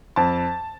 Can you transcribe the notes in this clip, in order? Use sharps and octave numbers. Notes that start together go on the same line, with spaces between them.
F2 A5